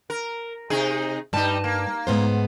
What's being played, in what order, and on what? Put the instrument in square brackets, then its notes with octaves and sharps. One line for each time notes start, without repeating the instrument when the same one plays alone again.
[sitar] A#4
C3 D#4 G#4
[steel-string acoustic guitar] G2 A5 [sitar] G3 D#4
[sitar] A#3
[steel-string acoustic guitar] G#2 B3 C5